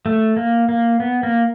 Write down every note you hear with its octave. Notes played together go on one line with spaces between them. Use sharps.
A3
A#3
A#3
B3
A#3